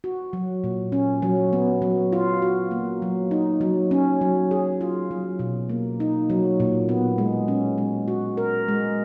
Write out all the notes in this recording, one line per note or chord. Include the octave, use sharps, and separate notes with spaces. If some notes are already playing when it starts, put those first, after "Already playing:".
F#4
F#3
A#2
C#4
F#3
B3
F#3
F4
F#4
A#3
F#3
D#4
F#3
C#4
F#3
G#4
F4
F#3
B2
A#3
D#4
F#3
A#2
B3
G#3
C#4
G#3
F#4
A#4
G#3